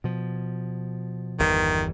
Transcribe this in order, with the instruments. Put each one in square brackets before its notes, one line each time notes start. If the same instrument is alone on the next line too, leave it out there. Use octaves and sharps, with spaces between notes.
[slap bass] B2 F3
[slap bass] G1 E2 E3 [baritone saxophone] D#3